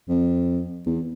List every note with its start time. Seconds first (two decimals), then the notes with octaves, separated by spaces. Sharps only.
0.09 F2
0.86 E2